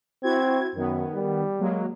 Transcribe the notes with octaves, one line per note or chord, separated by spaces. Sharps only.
C4 E4 F#4 G#6
F#2 D#3 B3
G3
F#3 G#3 A#3